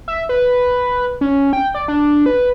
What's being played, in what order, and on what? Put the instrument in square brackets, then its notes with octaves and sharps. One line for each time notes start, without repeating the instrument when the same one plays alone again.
[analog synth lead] E5
B4
C#4
G5
D5
D4
B4